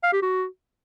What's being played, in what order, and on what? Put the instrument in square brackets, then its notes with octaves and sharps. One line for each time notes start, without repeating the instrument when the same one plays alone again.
[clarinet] F5
G4
F#4